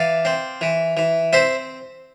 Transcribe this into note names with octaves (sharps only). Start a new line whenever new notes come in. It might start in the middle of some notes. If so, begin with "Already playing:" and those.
Already playing: E3 D5 F5
C4
E3
E3
C4 C5 E5